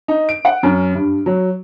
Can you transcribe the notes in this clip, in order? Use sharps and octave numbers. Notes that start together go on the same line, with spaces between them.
D#4
D7
F#5
F#2
G2
F#3